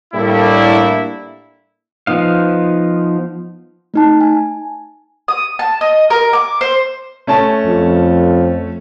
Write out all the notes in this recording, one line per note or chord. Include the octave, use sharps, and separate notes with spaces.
A2 G3 A3 A#3 D4 E4
F3 B3 D#4 F5
A3 D#4 A5
G#5
D#6
A5
D#5
A#4
D6
C5
A3 C#4 A5
F2